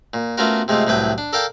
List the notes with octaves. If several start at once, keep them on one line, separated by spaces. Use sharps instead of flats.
A#2
A3 B3 C#4 F4 F#4 A#4
C3 G#3 A3 F4
C2 A2 F#3 B4 G5
D4
A4 A#4 D5 F5 G5